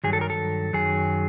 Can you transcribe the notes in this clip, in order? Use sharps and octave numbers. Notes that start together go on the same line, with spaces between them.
G2 D#3 F#3 G#4
A4
A#4
A4
F#2 D#3 F#3 G#4